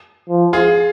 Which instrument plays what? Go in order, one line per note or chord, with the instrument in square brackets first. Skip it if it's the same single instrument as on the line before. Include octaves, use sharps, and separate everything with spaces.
[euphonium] F3
[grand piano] F4 G#4